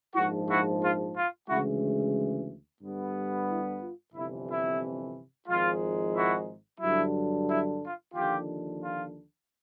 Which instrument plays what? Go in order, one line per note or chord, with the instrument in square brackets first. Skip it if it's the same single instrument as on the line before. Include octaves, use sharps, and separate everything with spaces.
[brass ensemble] A#1 G#2 F3 E4 F#4
E4 F#4
F4
F4
D2 C#3 E3 G#3 E4 F#4
G2 D3 G3 B3
E4
F4
G1 F2 C3 E3 E4
E4
G#1 G#2 F3 G#3 F4
E4 F#4
G2 D3 F#3 E4
E4
F4
D#2 D3 F3 F4 G4
F4